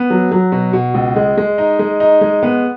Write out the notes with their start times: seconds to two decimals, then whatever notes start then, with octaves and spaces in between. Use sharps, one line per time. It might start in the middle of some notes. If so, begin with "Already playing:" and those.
Already playing: B3
0.10 F#3
0.32 F#3
0.52 B2
0.73 B2
0.94 C#2
1.16 G#3
1.37 G#3
1.58 D#4
1.79 G#3
2.00 D#4
2.21 G#3
2.43 B3